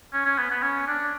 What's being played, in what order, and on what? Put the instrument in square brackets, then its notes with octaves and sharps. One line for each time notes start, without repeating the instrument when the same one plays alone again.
[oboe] C#4
C#4
B3
B3
C#4
D4